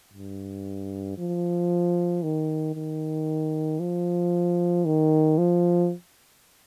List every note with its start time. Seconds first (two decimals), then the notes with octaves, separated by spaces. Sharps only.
0.13 G2
1.18 F3
2.23 D#3
2.75 D#3
3.80 F3
4.85 D#3
5.38 F3